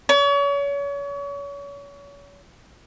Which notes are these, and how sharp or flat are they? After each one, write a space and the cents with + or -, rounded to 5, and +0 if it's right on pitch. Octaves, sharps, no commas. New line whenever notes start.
C#5 +35